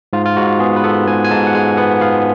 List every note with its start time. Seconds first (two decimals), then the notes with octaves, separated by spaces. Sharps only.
0.13 G#2 F4
0.26 F4
0.37 G#2 F#4
0.60 B3 G#4
0.76 B4
0.84 B3 A4
1.07 G#2 G#5
1.25 G#5
1.31 G#2 A5
1.47 F#5
1.55 G#3 G#5
1.77 B3 F#5
2.01 B3 F5